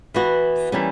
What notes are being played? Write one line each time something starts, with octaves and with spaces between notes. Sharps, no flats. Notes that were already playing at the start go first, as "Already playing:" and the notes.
E3 B3 F#4
E3 G3 A#3 C#4